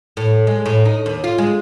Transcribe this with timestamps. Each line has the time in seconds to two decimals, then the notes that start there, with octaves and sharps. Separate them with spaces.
0.17 A2
0.47 G#3
0.66 A2
0.85 D#4
1.06 D#2
1.24 F4
1.38 G#3